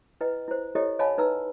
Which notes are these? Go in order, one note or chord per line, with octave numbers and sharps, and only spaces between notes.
E4 B4 D#5 G5
E4 C5
E4 G4 A4 C#5 D#5
C#5 D#5 F5 G#5 A5 B5
D#4 B4 A#5 E6